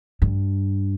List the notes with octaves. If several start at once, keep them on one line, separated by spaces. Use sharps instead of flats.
G2